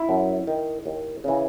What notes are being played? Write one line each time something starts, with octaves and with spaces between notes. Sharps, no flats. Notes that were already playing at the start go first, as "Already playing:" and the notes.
Already playing: E4
F#2
D#3
D#2
C#3 E3